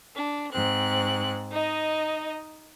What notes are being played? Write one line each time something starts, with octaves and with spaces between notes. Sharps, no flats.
D4
G#2 C4 F#6
D#4 D#5